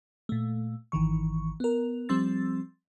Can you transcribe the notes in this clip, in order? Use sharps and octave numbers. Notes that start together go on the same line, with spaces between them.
A#2 A3
G#1 D#3 E3 C#6
B3 A#4
F3 G3 C4 C6 E6 A6